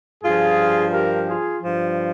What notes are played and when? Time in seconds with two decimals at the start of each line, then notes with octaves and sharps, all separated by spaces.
0.24 G2 F3 F4 G#4
0.93 G4 A#4
1.28 F4 G#4
1.63 G2 F3